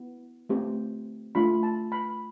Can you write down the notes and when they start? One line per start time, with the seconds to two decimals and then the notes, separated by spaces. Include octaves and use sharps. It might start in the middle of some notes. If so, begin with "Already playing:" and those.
Already playing: B3 E4
0.49 A3 C4 G4
1.35 A3 D4 F4 B5
1.63 A5
1.92 B5